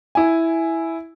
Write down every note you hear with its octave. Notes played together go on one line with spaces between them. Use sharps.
E4 G#5